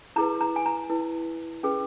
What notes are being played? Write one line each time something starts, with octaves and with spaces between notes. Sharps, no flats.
E4 G#4 B4 A#5
A#5
G#5
A#5
E4 B4
C#4 G#4 B4